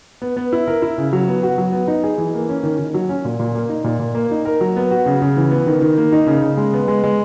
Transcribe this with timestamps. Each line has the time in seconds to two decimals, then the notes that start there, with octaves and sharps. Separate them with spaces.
0.22 B3
0.37 B3
0.52 E4
0.68 A#4
0.82 E4
0.98 C#3
1.13 F#3
1.28 B3
1.43 F#4
1.58 F#3
1.72 B3
1.88 D#4
2.04 G#4
2.18 E3
2.34 A#3
2.49 C#4
2.63 D#3
2.79 D#3
2.94 F#3
3.09 C#4
3.25 A#2
3.39 A#2
3.55 A#3
3.69 D#4
3.84 A#2
4.00 A#2
4.15 A#3
4.31 D#4
4.45 A#4
4.61 F#3
4.76 B3
4.91 F#4
5.06 C#3
5.22 C#3
5.37 E3
5.51 B3
5.67 D#3
5.81 D#3
5.97 A#3
6.12 D#4
6.27 C#3
6.42 C#3
6.57 G#3
6.73 B3
6.88 G#3
7.04 G#3